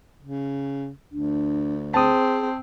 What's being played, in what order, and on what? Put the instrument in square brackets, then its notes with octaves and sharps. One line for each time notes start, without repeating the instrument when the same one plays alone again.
[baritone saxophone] C#3
[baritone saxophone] D2 [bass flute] D4
[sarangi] C4 [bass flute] G#4 [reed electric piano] A5 D#6